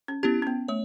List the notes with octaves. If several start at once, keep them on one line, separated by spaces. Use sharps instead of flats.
C#4
B3 C#4 E4 G4
C#4
B3
A3 C#5